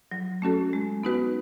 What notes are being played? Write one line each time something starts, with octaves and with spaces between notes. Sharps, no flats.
F#3
A3 C#4 F#4 A4
G#3
B3 D#4 F#4 B4